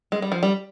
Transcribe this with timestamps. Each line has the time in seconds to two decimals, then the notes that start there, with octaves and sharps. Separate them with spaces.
0.12 G#3
0.22 G3
0.32 F3
0.43 G3